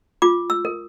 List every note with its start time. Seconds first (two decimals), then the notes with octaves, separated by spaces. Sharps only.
0.22 F4 D6
0.50 E6
0.65 A#4